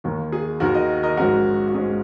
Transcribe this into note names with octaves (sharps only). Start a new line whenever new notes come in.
D#2 D#3 A#3
G#4
D#2 D#3 A#3 F#4 A#4
A#4 D#5
A#4 D#5
A#1 G#2 G#3 C#4 F#4 A#4
F#4
G#2 G#3 C#4 G#4